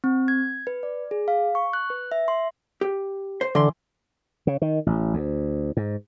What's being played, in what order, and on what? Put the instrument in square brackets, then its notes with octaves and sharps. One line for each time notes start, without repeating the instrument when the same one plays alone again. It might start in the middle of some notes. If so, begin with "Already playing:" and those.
[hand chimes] C4
G#6
B4
D5
G#4
F5
C#6
F#6
B4
E5
C6
[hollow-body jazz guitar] G4
C5
[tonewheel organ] D3 [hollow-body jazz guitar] E3 C6
[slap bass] C#3
D#3
A1
D2
G#2